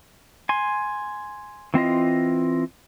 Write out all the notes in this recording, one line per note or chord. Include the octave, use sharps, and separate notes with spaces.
G#5 C6
E3 C4 F4 D#5